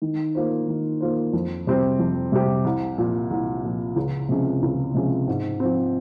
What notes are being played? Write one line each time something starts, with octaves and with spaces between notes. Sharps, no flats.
D#3
A#3 F4 C5
D#3
A#3 F4 C5
F2
C3 G3 C4 G4
F2
C3 G3 C4 G4
C2
A#2 F3
C2
A#2 F3
C#2
C3 F3 G#3 C#4
C#2
C3 F3 G#3 C#4
G#2
F3 C4